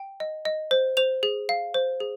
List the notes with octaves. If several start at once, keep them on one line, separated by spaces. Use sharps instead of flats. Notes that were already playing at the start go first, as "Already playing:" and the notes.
Already playing: G5
D#5
D#5
C5
C5 F7
G#4
F5
C5
G#4